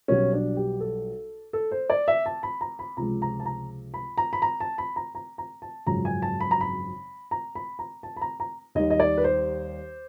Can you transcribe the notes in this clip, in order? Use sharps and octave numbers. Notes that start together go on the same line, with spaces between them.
B1 B2 G3 C#4
D4
G4
A4
A4
C5
D5
E5
A5
B5
A#5
B5
C#2 C3 F3 G#3 A#5
A#5
A5
A#5
B5
A#5
B5
A#5
A5
B5
A#5
A#5
A#5
A5
G#1 F#2 C#3 F3 G#3 A#5
G#5
A5
B5
A#5
B5
A#5
B5
A#5
A5
B5
A#5
A#5
D#2 D#3 G3 D#5
D#5
D5
B4
C5